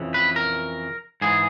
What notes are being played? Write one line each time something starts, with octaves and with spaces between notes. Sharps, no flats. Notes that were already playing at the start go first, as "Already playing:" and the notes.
Already playing: F2 C#3 E3
B4
A#4
G#2 E3 G#4